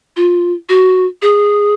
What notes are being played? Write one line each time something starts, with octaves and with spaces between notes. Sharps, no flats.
F4
F#4
G#4